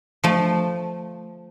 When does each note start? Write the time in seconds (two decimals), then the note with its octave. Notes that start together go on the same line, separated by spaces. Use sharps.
0.24 F3 A3